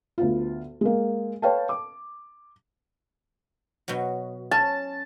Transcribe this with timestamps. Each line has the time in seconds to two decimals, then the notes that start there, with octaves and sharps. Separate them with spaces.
0.18 D2 B3 F4
0.81 G#3 A#3
1.42 B4 C#5 F5 G5 A5
1.69 D6
3.88 B2 F#3
4.51 C#4 A5